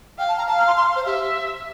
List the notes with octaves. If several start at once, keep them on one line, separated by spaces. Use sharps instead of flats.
F5 G5
A5
A#5
F5 A5
A#5
C6
C6
C5
G4 E5